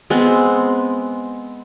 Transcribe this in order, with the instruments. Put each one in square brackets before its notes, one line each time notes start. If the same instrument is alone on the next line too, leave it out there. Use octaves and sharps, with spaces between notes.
[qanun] G#3 B3 C4